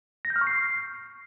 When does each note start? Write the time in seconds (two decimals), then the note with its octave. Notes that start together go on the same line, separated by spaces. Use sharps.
0.25 A#6
0.30 G6
0.36 F6
0.41 C#6
0.47 C7